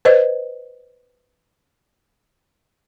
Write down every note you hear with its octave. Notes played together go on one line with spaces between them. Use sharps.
B4 C5 D#5